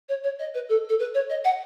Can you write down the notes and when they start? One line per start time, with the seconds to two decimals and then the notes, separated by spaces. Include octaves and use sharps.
0.09 C#5
0.24 C#5
0.39 D#5
0.54 B4
0.69 A4
0.89 A4
0.99 B4
1.14 C#5
1.30 D#5
1.44 F#5